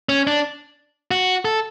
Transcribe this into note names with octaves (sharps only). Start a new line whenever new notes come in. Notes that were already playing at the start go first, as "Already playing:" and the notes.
C#4
D4
F#4
A4